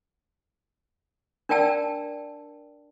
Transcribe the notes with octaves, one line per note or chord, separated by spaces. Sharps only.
D4 A#4 D5 G5 A5 E6